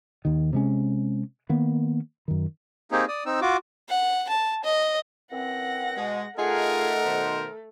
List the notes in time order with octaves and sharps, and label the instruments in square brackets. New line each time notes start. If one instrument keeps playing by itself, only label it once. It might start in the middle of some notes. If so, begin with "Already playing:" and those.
[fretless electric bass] D#2 D#3
C3 G#3 C#4
D#3 A#3 B3
F#2 D#3
[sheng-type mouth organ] A#3 C4 D#4 G4 G#4
D5 D#6
C4 D#4 E6
F4 F#4 D6
[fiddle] F#5
A5
D#5
[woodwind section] F#2 E3 C4 [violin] F#5 A#6
[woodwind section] B2 [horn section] G#3
[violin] A3 [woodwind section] D#4 F#5 [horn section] F4 G#4 [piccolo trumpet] A#4
[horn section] B2 D#3 C5